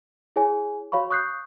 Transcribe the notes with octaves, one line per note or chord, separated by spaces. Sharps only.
E4 G#4 C#5 G#5
F#4 C#5 F5 B5 C#6
C#6 D#6 F#6 G6 C7